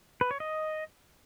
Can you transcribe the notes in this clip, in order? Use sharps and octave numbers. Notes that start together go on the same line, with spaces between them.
B4
C#5
D#5